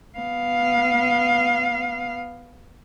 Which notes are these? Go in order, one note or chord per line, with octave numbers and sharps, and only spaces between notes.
B3 F5